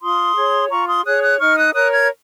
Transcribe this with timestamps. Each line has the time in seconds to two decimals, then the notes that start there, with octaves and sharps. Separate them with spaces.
0.01 F4 C6 D#6
0.35 G#4 C#5
0.70 F4 A#5 C#6
0.87 C6 D#6
1.05 G#4 C#5 D#6 F#6
1.22 D#6 F#6
1.39 D#4 C#6 F6
1.56 D#6 F#6
1.73 A#4 C#5 D#6 F#6
1.91 F6 G#6